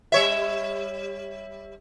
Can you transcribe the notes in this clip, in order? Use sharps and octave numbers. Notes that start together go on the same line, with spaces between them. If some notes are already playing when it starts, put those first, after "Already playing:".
G3 C#5 E5